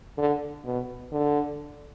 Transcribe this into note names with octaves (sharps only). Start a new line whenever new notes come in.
D3
B2
D3